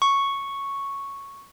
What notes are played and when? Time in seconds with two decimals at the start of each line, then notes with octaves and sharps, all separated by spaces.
0.02 C#6